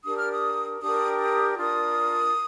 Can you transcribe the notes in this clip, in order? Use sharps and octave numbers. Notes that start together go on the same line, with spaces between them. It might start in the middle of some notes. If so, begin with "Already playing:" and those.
D4 G4 A#4 D#6
F6
D#6
D4 G4 A#4 D#6
D#6
D4 F4 A#4 D#6